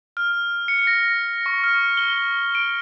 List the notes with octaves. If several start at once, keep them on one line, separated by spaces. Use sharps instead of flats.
F6
C#7
A#6
C#6
F6
G7
D7